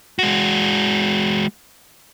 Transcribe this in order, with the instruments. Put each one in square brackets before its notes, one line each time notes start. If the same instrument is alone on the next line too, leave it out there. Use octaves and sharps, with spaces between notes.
[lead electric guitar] G#3 F#4